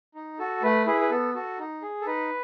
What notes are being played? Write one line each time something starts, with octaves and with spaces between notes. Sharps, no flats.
D#4
F#4 A4
A3 B4
E4 G#4 B4
B4
B3 A4
F#4 A4
D#4
G#4
A4
D#4 B4